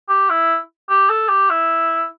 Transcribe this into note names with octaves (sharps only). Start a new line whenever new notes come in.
G4
E4
G4
A4
G4
E4